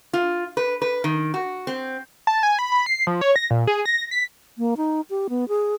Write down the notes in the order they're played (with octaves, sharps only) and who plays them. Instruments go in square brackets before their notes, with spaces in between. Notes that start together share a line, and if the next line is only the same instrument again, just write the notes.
[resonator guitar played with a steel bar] F4
B4
B4
D#3
F#4
C4
[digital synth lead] A5
G#5
B5
B5
C7
F3
C#5
A#6
A#2
G#4
A#6
B6
[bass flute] A#3
D#4
G4
B3
G#4